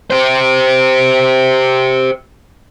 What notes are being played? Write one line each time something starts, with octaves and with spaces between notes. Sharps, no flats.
G4 C5